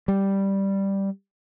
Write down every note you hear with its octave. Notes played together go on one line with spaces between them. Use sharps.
G3